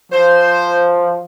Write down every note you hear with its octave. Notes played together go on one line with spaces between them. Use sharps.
F3 C5